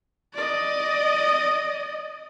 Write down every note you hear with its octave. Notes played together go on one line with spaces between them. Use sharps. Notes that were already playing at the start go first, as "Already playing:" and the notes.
D5 D#5